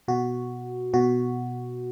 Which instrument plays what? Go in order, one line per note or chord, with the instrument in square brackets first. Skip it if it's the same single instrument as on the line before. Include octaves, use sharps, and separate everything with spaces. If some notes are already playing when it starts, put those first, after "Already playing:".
[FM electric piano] B2 F#4
B2 F#4